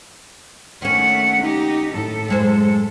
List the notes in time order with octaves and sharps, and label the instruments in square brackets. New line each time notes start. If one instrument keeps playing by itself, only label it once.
[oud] D#2 C#4 [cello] A3 F#5
[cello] D#4 G4
A2 A4
[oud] F#2 G#3 C5